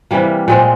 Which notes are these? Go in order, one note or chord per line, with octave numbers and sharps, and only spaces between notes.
C3 E3 G3 A#3
A#2 G#3 C4